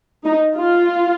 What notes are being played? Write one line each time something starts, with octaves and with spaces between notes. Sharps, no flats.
D#4
F4